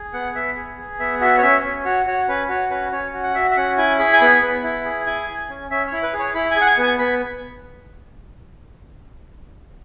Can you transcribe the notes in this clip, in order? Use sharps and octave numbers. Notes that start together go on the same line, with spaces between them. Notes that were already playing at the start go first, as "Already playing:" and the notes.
Already playing: G#4
B3 F#5
B3 E5
G#4
G#4
B3 E5
F#4 E5
C#5
C#4 E5
C#4
F#4 C#5
F#4 C#5
C#4 B4
F#4 C#5
C#4 B4
C#4 C#5
F#4
F#5
F#4 E5
E5
C#4 F#5
E4 G#5
G#4 B5
G#5
B3 B5
B3
E4
G#4
E4 G#5
G#4
C#4
C#4 E5
C#5
E4
B4
G#4
C#5
E4 B5
G#5
G#4 F#5
G#5
B3
G#5
B3 B5